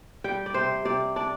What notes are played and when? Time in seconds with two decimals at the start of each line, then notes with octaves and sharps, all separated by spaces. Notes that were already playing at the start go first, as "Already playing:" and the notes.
0.24 G3 G5
0.46 D5
0.54 C3 C5
0.85 C3 D5
1.16 D4 D5